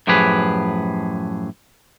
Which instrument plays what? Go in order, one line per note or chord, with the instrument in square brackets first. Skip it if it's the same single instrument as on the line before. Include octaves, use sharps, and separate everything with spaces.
[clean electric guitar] F#2 A2 F3 G4 G#4 B4